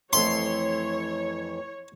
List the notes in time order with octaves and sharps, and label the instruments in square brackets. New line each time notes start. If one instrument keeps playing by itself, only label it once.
[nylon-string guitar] F2 E3 A3 [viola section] C#5 [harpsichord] C6